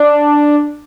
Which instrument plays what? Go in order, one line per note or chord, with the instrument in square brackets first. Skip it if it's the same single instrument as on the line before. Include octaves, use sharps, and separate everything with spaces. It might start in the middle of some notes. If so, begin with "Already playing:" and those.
Already playing: [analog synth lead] D4